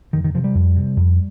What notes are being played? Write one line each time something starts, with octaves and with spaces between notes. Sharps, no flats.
F2 D#3
D#3
C3 F3
G3
F2
C3
F2